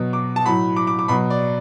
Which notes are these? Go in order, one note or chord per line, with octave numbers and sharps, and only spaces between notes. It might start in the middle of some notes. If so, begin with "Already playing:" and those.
Already playing: B2 F#3
D6
A5
A2 F#3 B5
D6
D6
D6
B2 F#3 B5
D5